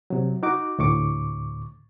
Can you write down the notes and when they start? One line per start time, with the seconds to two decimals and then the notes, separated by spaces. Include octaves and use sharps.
0.10 C3 F#3
0.43 D#4 F#4 D6
0.79 D2 A2 C#6 D6